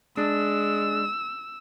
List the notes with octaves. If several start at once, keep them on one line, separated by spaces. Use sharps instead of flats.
G#3 D4 E6